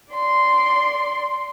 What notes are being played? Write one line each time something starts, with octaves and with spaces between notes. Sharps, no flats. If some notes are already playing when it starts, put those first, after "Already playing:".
D5 C6